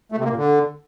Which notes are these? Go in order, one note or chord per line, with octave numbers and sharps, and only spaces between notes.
A3
C3
A#3
A#2
D3